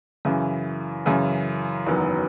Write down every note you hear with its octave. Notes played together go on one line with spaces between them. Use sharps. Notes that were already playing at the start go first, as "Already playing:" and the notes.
F#2 C#3 E3
F#2 C#3 E3
F#1 E2 D#3 F#3 B3